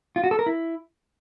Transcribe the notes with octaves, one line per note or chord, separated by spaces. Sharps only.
F4
F#4
A4
A#4
E4